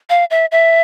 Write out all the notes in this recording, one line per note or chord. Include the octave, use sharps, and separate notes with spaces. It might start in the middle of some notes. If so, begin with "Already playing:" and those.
F5
E5
E5